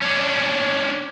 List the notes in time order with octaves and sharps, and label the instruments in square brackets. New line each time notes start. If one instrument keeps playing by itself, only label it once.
[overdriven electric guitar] C#4 D4